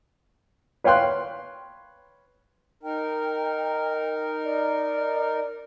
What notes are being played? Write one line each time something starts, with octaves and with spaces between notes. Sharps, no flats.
B4 C#5 F5 G5 C6 F#6
D#4 A#4 G5
D5